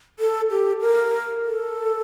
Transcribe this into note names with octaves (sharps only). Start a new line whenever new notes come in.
A4
G4
A#4
A4